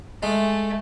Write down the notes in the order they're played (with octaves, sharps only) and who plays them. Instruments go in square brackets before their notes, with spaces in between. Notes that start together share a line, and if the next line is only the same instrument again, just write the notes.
[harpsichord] G#3 [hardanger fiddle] A3